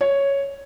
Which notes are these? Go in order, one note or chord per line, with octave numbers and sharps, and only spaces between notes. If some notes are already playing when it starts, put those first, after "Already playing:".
C#5